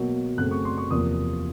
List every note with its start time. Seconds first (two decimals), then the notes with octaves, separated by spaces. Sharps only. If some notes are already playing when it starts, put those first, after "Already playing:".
Already playing: B2 F#3 A#3
0.38 F#2 C#3 F#3 A3 C4 F#6
0.51 C#6
0.65 C6
0.78 C#6
0.90 E2 C3 F3 A#3 D#6